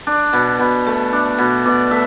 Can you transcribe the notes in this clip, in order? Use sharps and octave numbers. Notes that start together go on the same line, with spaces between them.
D4
B2
B2
A3
D4
B2
B2 D5
A3 E5